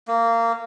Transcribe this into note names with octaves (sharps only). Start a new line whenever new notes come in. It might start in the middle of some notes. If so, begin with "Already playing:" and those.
A#3